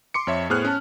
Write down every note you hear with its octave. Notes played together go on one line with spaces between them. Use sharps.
C6 D6 C#7
F2 C#5 E5
A2 B3 G#4 C5 F6 F#6
C#4 A5